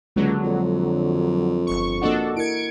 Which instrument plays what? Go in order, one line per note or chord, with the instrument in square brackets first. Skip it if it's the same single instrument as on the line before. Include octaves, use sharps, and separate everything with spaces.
[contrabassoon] C#2 [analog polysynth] D3 F#3 [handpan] G#3 A#3 F#4
[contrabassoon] F2
[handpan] D4 A#4
[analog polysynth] G1 C#6
[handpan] A#3 D#5 F#5 [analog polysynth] D4 F#4 A4
[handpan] E4 A#4 [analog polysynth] G#6 C#7 D7